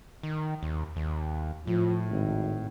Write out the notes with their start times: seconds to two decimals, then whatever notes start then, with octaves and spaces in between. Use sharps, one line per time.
0.23 D#3
0.63 D#2
0.96 D#2
1.67 A2 F3
2.11 G#1